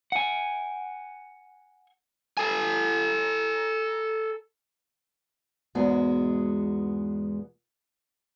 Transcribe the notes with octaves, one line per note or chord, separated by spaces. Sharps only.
F#5 G#5
A4 G#5
E2 G#2 G#3 B3 F#4 G#4